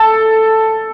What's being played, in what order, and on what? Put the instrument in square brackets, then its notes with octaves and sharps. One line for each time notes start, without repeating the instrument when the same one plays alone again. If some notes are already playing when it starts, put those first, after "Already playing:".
Already playing: [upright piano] A4